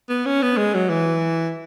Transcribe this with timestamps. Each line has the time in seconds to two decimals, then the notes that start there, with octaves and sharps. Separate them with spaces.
0.09 B3
0.26 C#4
0.42 B3
0.57 G#3
0.75 F#3
0.90 E3